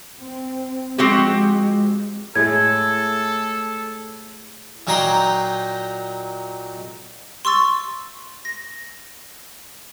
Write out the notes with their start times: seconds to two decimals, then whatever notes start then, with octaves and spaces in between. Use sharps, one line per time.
0.20 C4
0.98 F3 G#3 C4 F#4 G4
2.36 A2 G#3 A3 A4 G#6
4.87 A#2 F#3 D#4 G5 A#5 C6
7.45 C6 C#6 E6 A6
8.45 A#6